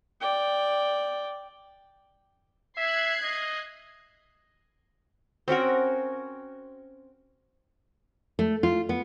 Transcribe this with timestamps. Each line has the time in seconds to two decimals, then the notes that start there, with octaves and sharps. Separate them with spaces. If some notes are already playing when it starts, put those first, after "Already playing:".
0.21 D5 G5
2.78 E5 F#6 G#6 C7
3.24 D#5
5.48 C4 C#4 F#4 A#4
8.39 A3
8.63 F4
8.89 B3